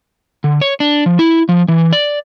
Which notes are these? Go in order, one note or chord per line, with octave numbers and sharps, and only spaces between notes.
D3
C#5
D4
F3
E4
F3
E3
D5